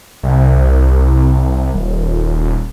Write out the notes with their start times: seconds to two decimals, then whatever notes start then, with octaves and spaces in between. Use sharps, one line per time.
0.23 C2
1.75 D#1